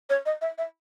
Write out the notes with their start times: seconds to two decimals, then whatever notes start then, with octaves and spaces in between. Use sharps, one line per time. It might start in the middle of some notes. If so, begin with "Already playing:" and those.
0.10 C#5
0.26 D#5
0.41 E5
0.58 E5